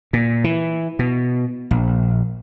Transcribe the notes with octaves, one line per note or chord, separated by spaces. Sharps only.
A#2
E3
B2
A#1